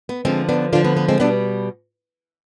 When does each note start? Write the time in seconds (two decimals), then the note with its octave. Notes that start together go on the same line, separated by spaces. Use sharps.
0.09 B3
0.25 D3 F3 G#3 C4
0.49 B3 D4
0.73 D3 F3 D4 F4
0.85 B3
0.97 B3
1.08 G#3 C4
1.20 B2 G3 B3 D4